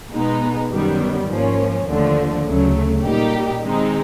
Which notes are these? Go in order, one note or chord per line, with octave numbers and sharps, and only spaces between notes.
B2 G#3 B3 D#4
F#2 D#3 G3 B3
G#2 F3 A#3 C#4
D#2 D3 F3 A3
D2 C#3 F#3 A3
A#2 G3 A#3 D#4 G4
D#3 G#3 C4 D#4